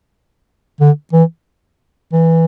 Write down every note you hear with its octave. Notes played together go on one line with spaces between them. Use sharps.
D3
E3
E3